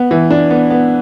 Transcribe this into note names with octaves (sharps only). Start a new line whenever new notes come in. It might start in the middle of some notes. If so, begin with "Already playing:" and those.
Already playing: B3
E3
D4
B3
B3